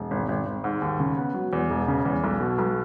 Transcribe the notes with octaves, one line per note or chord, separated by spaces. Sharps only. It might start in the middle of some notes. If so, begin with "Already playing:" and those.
Already playing: E1
G#1
G#1
G#1
G#2
D#2
C#3
B3
F#3
E2
E1
C#3
E2
B1
B2
B1